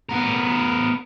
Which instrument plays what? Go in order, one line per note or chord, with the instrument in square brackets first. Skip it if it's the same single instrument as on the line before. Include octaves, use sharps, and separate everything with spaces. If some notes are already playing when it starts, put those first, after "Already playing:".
[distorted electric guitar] B3 A#4